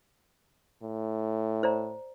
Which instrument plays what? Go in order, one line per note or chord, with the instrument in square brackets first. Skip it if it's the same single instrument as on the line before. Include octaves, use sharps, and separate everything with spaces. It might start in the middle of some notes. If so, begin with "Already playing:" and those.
[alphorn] A2
[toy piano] C5 D5 A#5